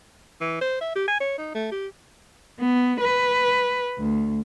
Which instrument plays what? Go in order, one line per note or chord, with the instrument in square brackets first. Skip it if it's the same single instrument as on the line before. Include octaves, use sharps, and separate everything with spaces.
[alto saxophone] E3
C5
E5
G4
G#5
C#5
D#4
A3
G4
[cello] B3
B4
D2